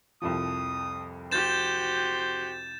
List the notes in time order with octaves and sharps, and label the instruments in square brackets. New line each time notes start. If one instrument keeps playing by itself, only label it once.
[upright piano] C2 F2 F3 [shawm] D#6
[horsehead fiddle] F#4 G4 [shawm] C5 [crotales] G6 A6 E7